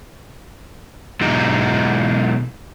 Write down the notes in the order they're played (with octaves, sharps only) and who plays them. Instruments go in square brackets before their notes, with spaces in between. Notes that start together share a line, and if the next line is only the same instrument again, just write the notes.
[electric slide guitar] B2 F#3 G#3 D#4 E4 G4